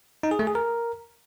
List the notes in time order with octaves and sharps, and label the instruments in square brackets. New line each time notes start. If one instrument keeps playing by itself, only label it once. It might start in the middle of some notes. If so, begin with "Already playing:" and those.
[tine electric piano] D#4
G#4
A3
G#4
A#4